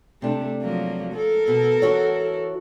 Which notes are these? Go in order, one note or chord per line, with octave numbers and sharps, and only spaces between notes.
C3 A3 D4
F3 F#3 A#3
A4 A#4
B2
E3 F#4 C#5